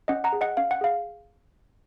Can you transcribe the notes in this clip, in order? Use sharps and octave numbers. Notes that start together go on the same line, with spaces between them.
C#4 D#5 F#5
F#5 A#5
G#4
D#5 F#5
C#4 F5
F#5
G#4 F5